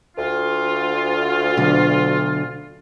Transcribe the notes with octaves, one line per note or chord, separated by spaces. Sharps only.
D2 F4
B2 D3 F#3